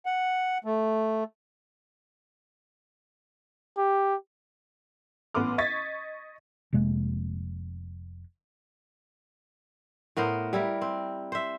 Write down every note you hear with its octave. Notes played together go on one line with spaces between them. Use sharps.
F#5
A3
G4
A1 B3 B4 C6 D6 F6
D#5 C#6 G#6 A6 B6
F1 C3 G#3 A#3
A2 B3 A#4 C5
G3 E4 A#4
C4
C5 E5